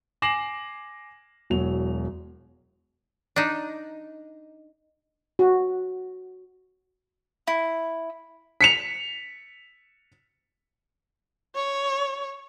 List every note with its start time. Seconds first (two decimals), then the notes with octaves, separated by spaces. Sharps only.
0.22 G#5 D6 A#6 C7 E7 F#7
1.50 E1 F#3 F7
3.36 D4 D#4
5.39 F#4
7.47 E4
8.61 B6 C#7 F7
11.55 C#5